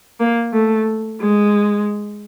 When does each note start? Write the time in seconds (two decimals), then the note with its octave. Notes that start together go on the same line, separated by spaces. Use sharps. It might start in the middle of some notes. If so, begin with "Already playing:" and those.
0.20 A#3
0.53 A3
1.20 G#3